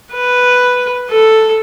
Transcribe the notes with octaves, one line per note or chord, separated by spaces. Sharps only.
B4
A4